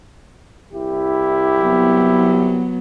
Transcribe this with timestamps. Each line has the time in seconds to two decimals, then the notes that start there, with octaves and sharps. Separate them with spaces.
0.73 C2 E4 G4
1.59 F#3 B3